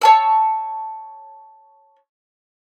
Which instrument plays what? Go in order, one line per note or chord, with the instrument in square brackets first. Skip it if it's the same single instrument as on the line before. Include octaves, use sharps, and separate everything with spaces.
[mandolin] C#5 A5 E6